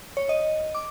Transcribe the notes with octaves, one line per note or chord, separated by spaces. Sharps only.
C#5
D#5
D6